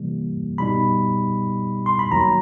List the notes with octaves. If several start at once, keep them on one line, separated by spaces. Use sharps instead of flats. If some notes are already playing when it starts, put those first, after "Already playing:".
Already playing: C3 E3 G3 A#3
B2 G3 B3 D#4 B5
C6
B5
D#2 D#3 F#3 A#5